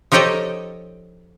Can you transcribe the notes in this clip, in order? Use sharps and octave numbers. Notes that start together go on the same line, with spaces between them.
F3 D#4 G4 A4 C#5 D#5